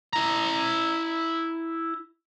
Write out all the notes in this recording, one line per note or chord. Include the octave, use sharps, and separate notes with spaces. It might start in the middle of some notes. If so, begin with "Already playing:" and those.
E4 A#5